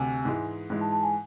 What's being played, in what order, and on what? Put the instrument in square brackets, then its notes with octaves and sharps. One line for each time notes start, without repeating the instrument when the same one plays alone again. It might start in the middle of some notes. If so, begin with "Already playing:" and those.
Already playing: [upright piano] D2 C3 [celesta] G#5
[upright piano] G#2 E3 G#3
G#2 E3 G#3
[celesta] A5
A5
G#5